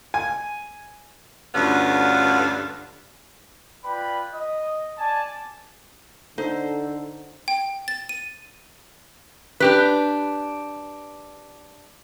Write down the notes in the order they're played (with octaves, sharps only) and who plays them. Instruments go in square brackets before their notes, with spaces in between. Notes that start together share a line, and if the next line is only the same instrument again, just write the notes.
[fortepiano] G#5
[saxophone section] D2 G2 D3 B3 C#4 F4
[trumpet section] F4 B4 D5 G5 B5
D#5
D5 G#5 A5
[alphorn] D3 [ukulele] D#4 [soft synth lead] A4 [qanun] C5
[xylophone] G5
A6
D#7
[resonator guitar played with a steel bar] D4 G4 B4